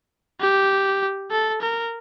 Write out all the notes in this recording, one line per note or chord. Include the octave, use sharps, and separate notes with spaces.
G4
A4
A#4